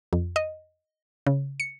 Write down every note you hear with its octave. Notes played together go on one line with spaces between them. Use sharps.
F2
D#5
C#3
C#7